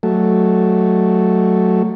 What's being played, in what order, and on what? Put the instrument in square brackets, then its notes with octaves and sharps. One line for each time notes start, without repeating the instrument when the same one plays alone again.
[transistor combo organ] F#3 A3